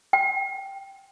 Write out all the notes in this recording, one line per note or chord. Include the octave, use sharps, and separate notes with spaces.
G5